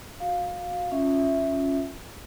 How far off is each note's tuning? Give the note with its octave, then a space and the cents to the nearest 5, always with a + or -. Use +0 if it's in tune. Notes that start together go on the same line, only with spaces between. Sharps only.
F#4 -20 F5 +10
C#4 +0 F4 +10 E5 +0